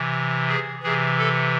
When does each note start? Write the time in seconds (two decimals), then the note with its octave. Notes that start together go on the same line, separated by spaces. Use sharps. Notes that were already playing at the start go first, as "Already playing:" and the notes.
Already playing: C3 E3
0.49 G#4
0.83 C3 E3 G#4
1.18 A4